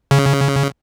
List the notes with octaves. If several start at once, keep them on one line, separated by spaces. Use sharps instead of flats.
C#3